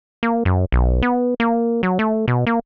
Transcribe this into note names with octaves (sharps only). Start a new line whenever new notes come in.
A#3
F#2
B1
B3
A#3
F#3
A3
B2
A#3